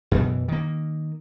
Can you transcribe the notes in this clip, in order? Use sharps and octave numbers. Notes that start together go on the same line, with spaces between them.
F#2 B2 E3
D#3 A#3